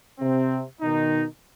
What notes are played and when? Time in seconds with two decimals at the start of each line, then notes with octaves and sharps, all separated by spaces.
0.19 C3 C4
0.81 B2 D#3 D#4